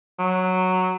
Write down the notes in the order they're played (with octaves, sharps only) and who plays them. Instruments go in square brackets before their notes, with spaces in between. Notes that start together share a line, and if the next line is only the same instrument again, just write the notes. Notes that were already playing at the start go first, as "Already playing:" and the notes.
[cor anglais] F#3